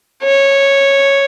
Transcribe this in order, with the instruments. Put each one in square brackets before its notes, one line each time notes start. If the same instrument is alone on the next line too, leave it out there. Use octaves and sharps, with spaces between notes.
[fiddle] C#5